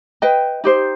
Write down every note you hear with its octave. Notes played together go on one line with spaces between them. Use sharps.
B4 D#5 G5
D#4 G4 C5